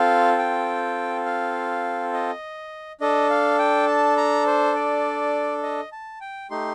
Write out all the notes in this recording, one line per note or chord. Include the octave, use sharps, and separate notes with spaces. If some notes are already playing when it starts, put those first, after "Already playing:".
Already playing: C4 F4 A4 F5
G5
F5
D#5
D4 A4 D#5
F5
G5
A5
A#5
C5
D5
D#5
A5
G5
A3 D#4 G4 C6